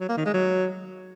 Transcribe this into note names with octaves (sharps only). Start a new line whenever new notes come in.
F#3
A#3
D#3
G#3
F#3